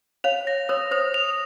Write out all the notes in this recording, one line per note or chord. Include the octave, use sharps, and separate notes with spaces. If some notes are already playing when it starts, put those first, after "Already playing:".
C#5 F5 F7
A#6
A#4 C#5 D#6
C5 D#6
F7